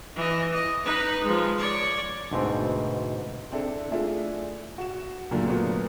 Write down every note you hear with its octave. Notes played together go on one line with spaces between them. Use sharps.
E3 D#5
D#5
D#4 B4
F3 G#3
C#5 D5
D2 G#2 B2 C4
C4 D4 E4 A4
A3 D4 E4 F4 G#4
F#4 E7
F#2 A#2 D3 A3
A#2 F#3 A3 B3